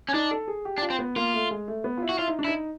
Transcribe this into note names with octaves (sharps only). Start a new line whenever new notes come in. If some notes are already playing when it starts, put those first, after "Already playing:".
C#4
D4 D#4
A4
G#4
G4
D4
F4
C4
B3
A#3 F4
A3
G#3
A3
B3
F4
E4
F#4
E4 F4
D#4
D4
E4
D#4